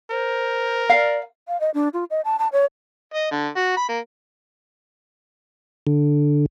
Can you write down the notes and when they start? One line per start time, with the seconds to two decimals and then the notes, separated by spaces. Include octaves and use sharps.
0.11 A#4 C5
0.90 D5 F5
1.48 F5
1.60 D#5
1.74 D4
1.93 F4
2.10 D#5
2.25 A5
2.39 A5
2.53 C#5
3.14 D#5
3.31 D3
3.56 F#4
3.77 B5
3.89 A#3
5.87 D3